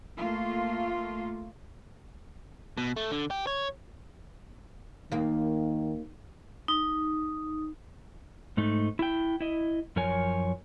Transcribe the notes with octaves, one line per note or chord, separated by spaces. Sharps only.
A3 A#3 F4
B2
A3
D3
G4
C#5
D#2 D#3 A#3
D#4
G#2 A3 D#4
E4 G5
E4 D#5
F#2 F3 A#4 C#5 G#5